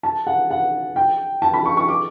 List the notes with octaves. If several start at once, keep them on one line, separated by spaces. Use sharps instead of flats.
A5
F#5
F#5
G5
A5
B5
C#6
C#6
D6